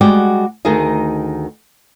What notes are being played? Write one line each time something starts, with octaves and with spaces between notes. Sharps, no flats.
G3 G#3 F#4 D5 F#5 G5
D2 D#3 D#4 G#4 A#4 D#5